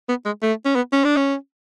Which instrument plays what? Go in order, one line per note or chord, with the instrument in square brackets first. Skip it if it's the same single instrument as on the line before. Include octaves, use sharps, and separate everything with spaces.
[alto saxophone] B3
G#3
A3
C#4
B3
C#4
D4
C#4